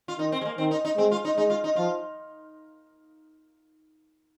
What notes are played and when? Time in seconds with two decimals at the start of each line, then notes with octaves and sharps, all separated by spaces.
0.08 F4
0.18 D#3 D#4
0.32 C4
0.41 G#3
0.45 A#3
0.58 D#3 C4
0.71 D#4
0.85 D#4
0.97 G#3 C4
1.11 F4
1.25 D#4
1.37 G#3 D#4
1.50 F4
1.64 D#4
1.76 F3 F4